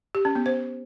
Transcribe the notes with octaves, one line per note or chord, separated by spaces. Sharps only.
G4
C#4
B3
C5